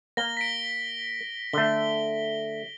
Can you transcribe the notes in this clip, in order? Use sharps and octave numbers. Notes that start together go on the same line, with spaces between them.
A#3 A#6 G7
B6 D7
D3 A3 G7